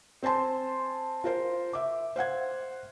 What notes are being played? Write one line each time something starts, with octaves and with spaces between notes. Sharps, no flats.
C4 C5 G#5 A5 C6
F4 A#4 C5 F5
E5 D6
C5 F5 F#5 G#6